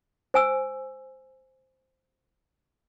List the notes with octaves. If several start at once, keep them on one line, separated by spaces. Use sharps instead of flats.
C5 G#5 E6